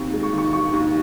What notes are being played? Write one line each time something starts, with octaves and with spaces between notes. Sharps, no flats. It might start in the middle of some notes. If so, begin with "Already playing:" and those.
Already playing: D#2 C4
G#3
C#6
D#3 C#6
D#4 C#6
D#2